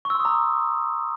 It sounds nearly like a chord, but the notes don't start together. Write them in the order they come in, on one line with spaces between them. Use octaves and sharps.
C#6 E6 C6 D#6 A#5